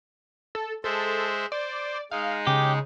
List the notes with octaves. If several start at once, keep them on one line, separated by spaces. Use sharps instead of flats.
A4
G#3 A4 C5 E5
C5 D5
G#3 D#4 F5
C#3 G4